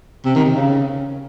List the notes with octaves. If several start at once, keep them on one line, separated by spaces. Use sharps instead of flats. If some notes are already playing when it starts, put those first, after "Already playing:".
C3
D#3
C3
C#3